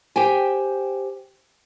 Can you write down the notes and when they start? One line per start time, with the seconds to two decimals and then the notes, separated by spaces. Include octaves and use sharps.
0.16 G4 C5 G5 G#5